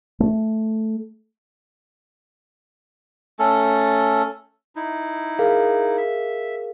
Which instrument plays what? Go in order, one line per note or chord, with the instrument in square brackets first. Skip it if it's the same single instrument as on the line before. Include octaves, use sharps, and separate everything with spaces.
[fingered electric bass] A3
[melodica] A3 C#4 A4
[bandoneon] D#4 E4
[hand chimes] G#4 A#4 F5
[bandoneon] E5